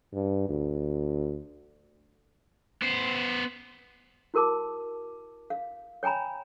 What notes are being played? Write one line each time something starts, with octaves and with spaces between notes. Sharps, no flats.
G2
D2
B3 C5
E4 F#4 A#4 A5 D6
F5
C#5 G5 G#5 A#5 B5